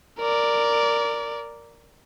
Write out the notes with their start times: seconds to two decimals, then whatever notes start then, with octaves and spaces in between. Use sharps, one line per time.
0.19 A#4 D5